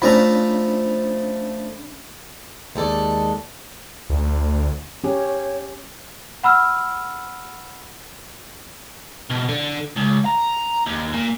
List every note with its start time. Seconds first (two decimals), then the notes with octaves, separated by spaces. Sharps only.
0.02 F3 A3 C#4 D4 A#5 B5
2.76 D#2 G#3 A4 D5
4.10 D2
5.04 C#4 G4 C#5
6.43 F#5 B5 E6 F6
9.31 B2
9.49 D3
9.96 C#2
10.25 A#5
10.87 D#2
11.14 A#2